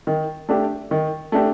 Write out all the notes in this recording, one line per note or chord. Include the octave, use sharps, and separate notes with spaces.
D#3
A3 D4 G4
D#3
A3 D4 G4